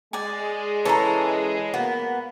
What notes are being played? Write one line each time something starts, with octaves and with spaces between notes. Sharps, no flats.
G#3 D5 G#5
E3 C#4 A4 A5 A#5
A#3 B3 F#4